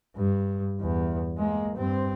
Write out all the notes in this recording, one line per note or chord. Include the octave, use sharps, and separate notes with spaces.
G2
E2
G#3 A#3
G2 C4